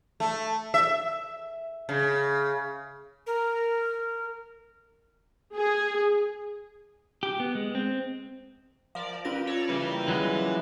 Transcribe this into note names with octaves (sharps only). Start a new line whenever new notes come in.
A3
E5
C#3
A#4
G#4
G4
B3
G#3
C4
F3 A#4 D5 F5
C#4 F4 G4 A#4 B4 A#6
A4 C#5 D5
C#3 G3 A#3 E4 B4
E3 F#3 G#3